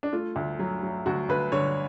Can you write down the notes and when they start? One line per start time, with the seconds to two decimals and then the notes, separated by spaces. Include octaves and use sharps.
0.03 D4
0.13 A3 F4
0.36 D2
0.59 F#3
0.83 F#3
1.06 D2 F#4
1.29 D2 B4
1.52 D3 C#5